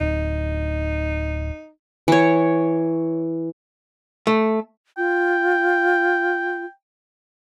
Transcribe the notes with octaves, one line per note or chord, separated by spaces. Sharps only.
D1 D#4
E3 C#5
A3
F4 G5